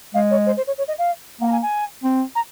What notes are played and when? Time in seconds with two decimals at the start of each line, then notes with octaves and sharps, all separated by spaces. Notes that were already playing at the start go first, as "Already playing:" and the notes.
0.14 G#3 F5
0.31 C#5
0.46 C5
0.57 C5
0.67 C#5
0.78 C#5
0.88 D#5
0.98 F5
1.41 A#3 F#5
1.47 A#5
1.52 G#5
1.62 G#5
2.03 C4
2.35 A#5